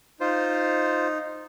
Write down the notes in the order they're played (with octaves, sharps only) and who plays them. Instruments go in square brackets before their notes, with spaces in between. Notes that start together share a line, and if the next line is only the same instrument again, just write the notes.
[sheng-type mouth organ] D#4 [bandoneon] F4 C5